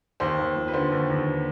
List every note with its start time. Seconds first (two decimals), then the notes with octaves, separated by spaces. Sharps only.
0.20 D#2 C5
0.38 D#2
0.56 F3
0.68 B4
0.73 D3 C5
0.91 D#2
1.10 D#2